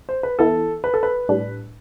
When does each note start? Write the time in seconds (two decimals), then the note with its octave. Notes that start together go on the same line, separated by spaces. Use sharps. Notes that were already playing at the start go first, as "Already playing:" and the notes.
0.09 C5
0.23 B4
0.39 E3 B3 E4 A4
0.84 B4
0.94 A4
1.03 B4
1.29 A2 G3 D4